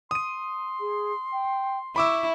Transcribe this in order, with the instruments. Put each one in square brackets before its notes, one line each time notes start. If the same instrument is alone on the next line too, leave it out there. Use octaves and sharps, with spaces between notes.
[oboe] C6 [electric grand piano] D#6 D#7
[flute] G#4
G5
[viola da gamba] E4 [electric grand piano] B5 D6 E6 [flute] C#6